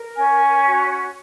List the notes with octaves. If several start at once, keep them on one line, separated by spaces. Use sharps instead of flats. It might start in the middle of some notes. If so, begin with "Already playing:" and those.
Already playing: A#4
C#4 G#5
F#4